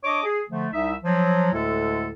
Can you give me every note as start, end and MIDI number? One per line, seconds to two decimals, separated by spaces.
0.04 0.21 62
0.04 0.21 73
0.04 0.21 75
0.04 0.21 86
0.23 0.41 68
0.49 0.67 50
0.49 0.67 53
0.49 0.67 57
0.72 0.94 36
0.72 0.94 63
0.72 0.94 76
1.03 1.50 53
1.03 1.50 54
1.53 2.13 38
1.53 2.13 45
1.53 2.13 50
1.53 2.13 56
1.53 2.13 69